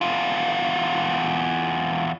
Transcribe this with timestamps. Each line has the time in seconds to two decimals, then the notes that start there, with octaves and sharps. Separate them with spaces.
0.01 E2 F4